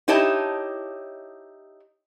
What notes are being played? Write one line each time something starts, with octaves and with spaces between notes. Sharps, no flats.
D#4 E4 G4 C#5 D#5 A5